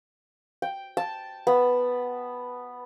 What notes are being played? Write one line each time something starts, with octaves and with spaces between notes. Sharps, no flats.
G5
A5
B3